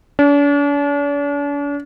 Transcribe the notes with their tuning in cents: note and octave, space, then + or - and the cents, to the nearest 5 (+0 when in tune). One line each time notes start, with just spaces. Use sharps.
D4 -45